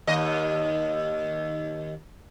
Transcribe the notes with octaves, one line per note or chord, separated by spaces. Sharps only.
D#2 D#5